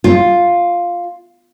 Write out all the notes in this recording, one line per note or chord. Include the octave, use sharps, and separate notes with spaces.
F4